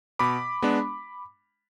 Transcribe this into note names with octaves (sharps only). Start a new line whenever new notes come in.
B2 B5 D6
G#3 B3 D4